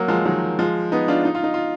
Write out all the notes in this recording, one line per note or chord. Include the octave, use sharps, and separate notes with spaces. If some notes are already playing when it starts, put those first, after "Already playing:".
Already playing: F#3 A#3
F3 G#3
D#3 F#3
F3 G#3
B3 D#4
D4 F4
D#4
F4
D#4
F4